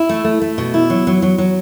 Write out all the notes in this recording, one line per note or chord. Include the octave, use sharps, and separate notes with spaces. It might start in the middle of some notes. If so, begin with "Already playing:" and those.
Already playing: E4
A3
A3
A3
B2
E4
F#3
F#3
F#3
F#3